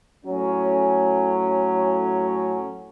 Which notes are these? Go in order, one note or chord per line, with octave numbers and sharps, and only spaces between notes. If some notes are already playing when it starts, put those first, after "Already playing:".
A2 F#3 C#4